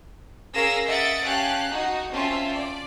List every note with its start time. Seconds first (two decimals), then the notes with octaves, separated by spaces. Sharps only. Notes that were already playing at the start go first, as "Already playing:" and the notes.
0.53 C#4 G#4 A#4 F5 E6 A#6
0.86 D#5 E5 F#5 A6 C#7 D7
1.24 C#4 G4 F5 A5 F#6
1.71 D#4 F#4
2.12 C4 C#4 F4 E5 A5
2.51 D5